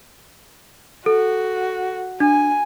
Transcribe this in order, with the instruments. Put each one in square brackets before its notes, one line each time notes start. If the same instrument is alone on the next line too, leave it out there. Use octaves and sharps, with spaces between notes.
[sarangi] F#4 [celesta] A4
[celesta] D4 [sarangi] G#5